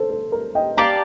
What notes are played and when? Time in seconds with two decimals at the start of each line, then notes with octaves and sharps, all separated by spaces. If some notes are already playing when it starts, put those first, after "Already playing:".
Already playing: A4 C5
0.11 A4
0.32 A#4
0.55 D#5 G5
0.77 G4 D5 F5 A5 A#5 D6